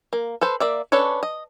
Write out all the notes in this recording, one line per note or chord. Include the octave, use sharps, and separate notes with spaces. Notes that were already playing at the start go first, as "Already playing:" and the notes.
A#3
A4 B4 C5
A#3 D5 E5
C#4 D4 A4 B4 C#5
D#5